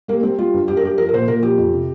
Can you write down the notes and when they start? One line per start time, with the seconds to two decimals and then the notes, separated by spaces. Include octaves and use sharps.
0.08 G3 A#3
0.23 G3 C4
0.38 G3 F4
0.54 G2
0.68 G2 G4
0.77 A#4
0.83 G2 G4
0.98 F3 A#4
1.09 A#4
1.13 A#2 C5
1.28 A#2 A#4
1.43 F3 G4
1.58 F2
1.73 C3